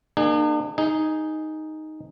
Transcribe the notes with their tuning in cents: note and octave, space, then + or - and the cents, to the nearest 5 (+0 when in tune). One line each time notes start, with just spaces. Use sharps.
A#3 +0 D4 +45 G#4 -5
D#4 +0 G#4 +0